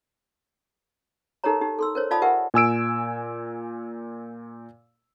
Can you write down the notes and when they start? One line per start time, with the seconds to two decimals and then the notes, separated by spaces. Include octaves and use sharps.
1.44 D#4 G4 A4 A#4 C#5 A#5
1.61 D#4 G4
1.79 A4 C6 E6
1.95 A#4 C5 C#5
2.11 F4 D5 F5 A5 B5 D#6
2.22 G4 A#4 B4 E5 F#5 G#5
2.54 A#2 G#5 E6 D7